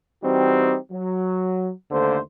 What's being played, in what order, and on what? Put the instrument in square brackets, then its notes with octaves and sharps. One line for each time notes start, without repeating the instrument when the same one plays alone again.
[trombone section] E3 G3 C4 D#4 F#4 G4
F#3
D#2 D3 A3 A#3 C5